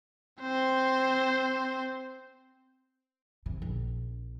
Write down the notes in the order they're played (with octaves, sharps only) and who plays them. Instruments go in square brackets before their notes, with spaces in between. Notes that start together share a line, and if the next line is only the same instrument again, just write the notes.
[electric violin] C4 C5
[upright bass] C3
A#1